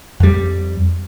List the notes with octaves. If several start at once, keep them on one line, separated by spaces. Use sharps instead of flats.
F2 G3